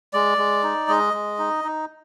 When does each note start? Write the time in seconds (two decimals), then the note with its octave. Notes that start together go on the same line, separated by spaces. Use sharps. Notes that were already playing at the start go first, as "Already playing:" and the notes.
0.13 G#3 D5
0.38 G#3
0.63 D#4
0.88 G#3 D#5
1.14 G#3
1.39 D#4
1.64 D#4